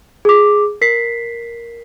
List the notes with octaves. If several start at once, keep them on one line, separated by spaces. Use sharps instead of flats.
G#4 D6
A#4 B6 C7